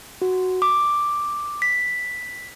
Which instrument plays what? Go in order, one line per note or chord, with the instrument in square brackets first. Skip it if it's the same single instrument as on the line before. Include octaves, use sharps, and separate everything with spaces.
[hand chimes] F#4
D6
B6